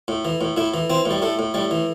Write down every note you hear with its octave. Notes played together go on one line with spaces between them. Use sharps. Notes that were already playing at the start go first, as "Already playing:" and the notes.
A2
E3
A2
A2 E4
E3
E3 C4
A2
G3
A2 A3
A2
A2 G3
E3